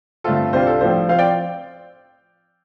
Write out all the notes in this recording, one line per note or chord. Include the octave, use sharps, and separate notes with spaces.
G2 D3 A3 C4 F4 A4
C2 C3 G3 D4 F4 C5
A4
A2 F3 D4 C5
F3 C4 F4 C5 F5
D5 G5